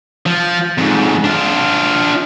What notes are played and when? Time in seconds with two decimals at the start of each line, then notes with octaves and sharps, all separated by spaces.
0.26 F3
0.78 F2 G#2
1.24 D4 F4